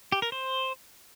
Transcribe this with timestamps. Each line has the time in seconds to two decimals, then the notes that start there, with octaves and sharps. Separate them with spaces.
0.12 G4
0.22 A#4
0.32 C5